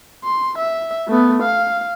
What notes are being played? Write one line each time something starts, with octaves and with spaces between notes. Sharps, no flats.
C6
E5
A3 B3
F5